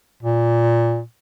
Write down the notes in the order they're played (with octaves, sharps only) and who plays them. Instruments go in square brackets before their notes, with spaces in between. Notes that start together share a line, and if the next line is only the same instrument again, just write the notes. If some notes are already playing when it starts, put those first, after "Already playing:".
[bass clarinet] A#2